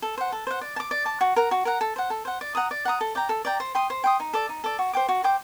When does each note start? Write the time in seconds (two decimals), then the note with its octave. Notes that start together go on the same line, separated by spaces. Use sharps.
0.02 A4
0.18 C5 F#5
0.32 A4
0.47 C5 F#5
0.61 D5
0.76 A5
0.80 D6
0.91 D5
1.06 A5 D6
1.21 F#4
1.36 A#4 F#5 A#5
1.51 F#4
1.65 A#4 F#5 A#5
1.81 A4
1.96 C5 F#5
2.10 A4
2.25 C5 F#5
2.41 D5
2.55 F#5 A#5 D#6
2.71 D5
2.85 F#5 A#5 D#6
3.01 A4
3.15 D5 G5 A#5
3.29 A4
3.45 D5 G5 A#5
3.60 C5
3.75 G5 C6 D#6
3.90 C5
4.04 G5 C6 D#6
4.20 D#4
4.34 A4 D5
4.49 D#4
4.64 A4 D5
4.79 F#4
4.93 C5 G5 D6
5.09 F#4
5.24 C5 G5 D6